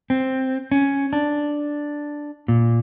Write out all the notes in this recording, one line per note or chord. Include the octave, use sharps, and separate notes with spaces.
C4
C#4
D4
A#2